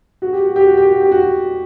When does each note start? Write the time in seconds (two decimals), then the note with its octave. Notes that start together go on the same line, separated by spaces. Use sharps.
0.22 F#4
0.33 G4
0.44 F#4
0.56 G4
0.67 F#4
0.77 G4
0.90 F#4
1.01 G4
1.11 F#4